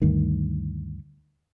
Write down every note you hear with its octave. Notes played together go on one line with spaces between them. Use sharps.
D2 G2 D#3